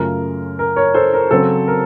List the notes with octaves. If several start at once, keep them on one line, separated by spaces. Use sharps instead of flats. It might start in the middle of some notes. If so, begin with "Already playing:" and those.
Already playing: F#2 C#3 A3 C#4 F4 A#4
A#4
A#4 C#5
A4 C5
A#4
C#3 F#3 C4 A4
A#4